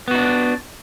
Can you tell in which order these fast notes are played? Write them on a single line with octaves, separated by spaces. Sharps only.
B3 F#4 D#4 D4